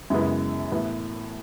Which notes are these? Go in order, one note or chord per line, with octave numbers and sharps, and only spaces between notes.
F#2 C#3 G#3 B3 E4
A2 E3 B3 E4